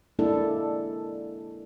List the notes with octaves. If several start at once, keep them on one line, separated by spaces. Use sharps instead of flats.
G#3 A#3 D4 E4 A4